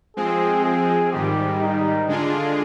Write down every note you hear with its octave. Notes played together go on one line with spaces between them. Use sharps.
F3 G#3 C4 G#4
G#4
G#2 D#3 G3 G4
D#4
D3 G#3 D4 F4 G#4